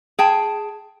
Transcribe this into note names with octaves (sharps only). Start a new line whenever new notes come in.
G#4 G5 A5